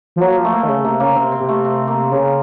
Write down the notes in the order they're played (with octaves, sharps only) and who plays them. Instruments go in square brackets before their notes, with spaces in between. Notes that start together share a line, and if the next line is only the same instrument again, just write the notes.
[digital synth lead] F3
[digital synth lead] F#3 [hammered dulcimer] A#3
[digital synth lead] F3
[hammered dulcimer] A3
[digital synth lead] A#3
D#3
[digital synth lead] C#3 [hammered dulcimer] A3
[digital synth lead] C3 [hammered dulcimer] A#3
[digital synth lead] C#3 [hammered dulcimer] A#3
[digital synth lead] C3 [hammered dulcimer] C4
[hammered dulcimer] C4
[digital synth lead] C3
[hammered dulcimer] A3
C4
A#3
[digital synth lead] C#3 [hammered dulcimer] A#3